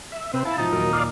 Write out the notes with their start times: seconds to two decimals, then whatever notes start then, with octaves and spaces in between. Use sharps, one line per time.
0.12 E5
0.34 C3 C4 B4 C5
0.45 E4 F5 A5
0.58 G#2 B2 F3 D#4
0.73 D#2 A#2 F#3 A#4
0.93 D5 F5